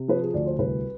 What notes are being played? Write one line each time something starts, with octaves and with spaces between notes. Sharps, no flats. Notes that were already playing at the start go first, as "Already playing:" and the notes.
Already playing: C3
F3 B4
G#4
D2 D5
C5
C2 B4